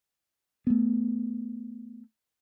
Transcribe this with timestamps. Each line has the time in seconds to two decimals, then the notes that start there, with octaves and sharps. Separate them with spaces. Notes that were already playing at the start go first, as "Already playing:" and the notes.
0.67 A3 B3